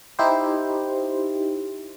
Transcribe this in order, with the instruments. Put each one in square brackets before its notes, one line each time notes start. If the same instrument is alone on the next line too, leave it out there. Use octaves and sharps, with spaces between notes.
[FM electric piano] D#4 E4 G4 C5